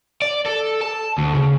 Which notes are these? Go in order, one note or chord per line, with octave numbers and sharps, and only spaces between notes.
D5
A4
A5
D2
C#3